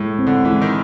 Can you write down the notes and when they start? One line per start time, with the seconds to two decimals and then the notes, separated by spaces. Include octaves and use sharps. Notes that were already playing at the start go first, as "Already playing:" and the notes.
Already playing: A2 G#3
0.19 C4
0.27 D3
0.44 E3 G#3
0.61 D#3